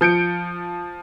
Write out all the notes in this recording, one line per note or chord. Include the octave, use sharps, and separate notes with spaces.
F3 G6 C#7 D7